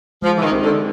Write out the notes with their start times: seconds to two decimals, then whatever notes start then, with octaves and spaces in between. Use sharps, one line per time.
0.22 F3 G#3
0.38 E3
0.42 D#3
0.52 C4 D#4 G4 A#4
0.62 D3